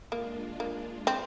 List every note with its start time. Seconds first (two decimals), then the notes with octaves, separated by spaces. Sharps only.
0.12 G#3 A#3 D4 F4
0.60 A#3
1.07 C4